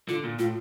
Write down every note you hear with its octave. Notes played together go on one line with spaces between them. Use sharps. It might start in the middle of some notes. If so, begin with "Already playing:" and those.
D3 F4
A#2
A2 F4